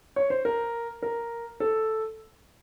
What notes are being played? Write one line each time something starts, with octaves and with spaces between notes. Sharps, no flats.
C#5
C5
A#4
A#4
A4